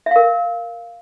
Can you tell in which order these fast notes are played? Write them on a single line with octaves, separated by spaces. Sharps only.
E5 F5 A#4